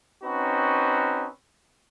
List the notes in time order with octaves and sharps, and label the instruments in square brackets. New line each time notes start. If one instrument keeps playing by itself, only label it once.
[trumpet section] C4 C#4 D#4 F#4 B4